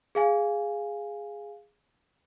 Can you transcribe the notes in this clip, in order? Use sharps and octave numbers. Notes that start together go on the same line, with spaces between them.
G#4 F5 G#5